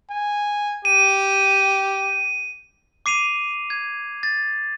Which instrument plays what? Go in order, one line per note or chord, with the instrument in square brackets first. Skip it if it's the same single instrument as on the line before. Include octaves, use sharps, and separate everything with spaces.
[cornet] G#5
[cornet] G4 [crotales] D#7
[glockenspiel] D6 C7 D#7 F7
G#6
A6